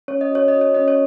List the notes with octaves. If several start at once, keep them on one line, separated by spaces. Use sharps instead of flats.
C#4 C#5
D#5
F#4 C#5
D#5
F#4
C#5
C#4 D#5
C#5